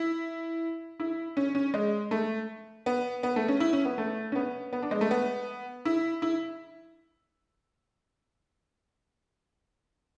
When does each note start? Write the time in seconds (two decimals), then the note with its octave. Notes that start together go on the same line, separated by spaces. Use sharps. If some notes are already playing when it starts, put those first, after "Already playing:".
Already playing: E4
1.00 E4
1.37 C#4
1.55 C#4
1.74 G#3
2.11 A3
2.86 B3
3.23 B3
3.36 A3
3.48 C#4
3.60 E4
3.73 C#4
3.85 B3
3.98 A3
4.32 C#4
4.35 B3
4.73 B3
4.82 D4
4.91 G#3
5.01 A3
5.11 B3
5.85 E4
6.22 E4